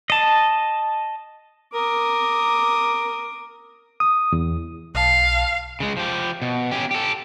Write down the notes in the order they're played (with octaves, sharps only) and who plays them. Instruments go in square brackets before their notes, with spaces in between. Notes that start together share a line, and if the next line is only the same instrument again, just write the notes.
[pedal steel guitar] D#5 A5
[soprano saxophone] A#4 [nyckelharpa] D6 D#6
[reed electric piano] D#6
E2
[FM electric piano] B1 A5 [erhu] F5
[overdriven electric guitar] C#3 G#3
F3 G4
B2
C#4 G4
G4 A4